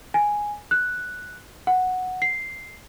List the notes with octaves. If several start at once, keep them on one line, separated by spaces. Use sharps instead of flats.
G#5
F#6
F#5
C7